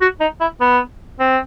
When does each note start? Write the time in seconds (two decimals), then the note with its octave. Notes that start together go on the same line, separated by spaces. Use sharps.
0.01 F#4
0.21 D#4
0.40 E4
0.61 B3
1.19 C4